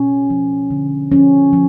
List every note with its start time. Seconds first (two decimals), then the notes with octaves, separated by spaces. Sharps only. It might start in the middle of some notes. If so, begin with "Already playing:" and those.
Already playing: B2 C#4
0.30 F3
0.71 D3
1.11 F3 C#4
1.53 F3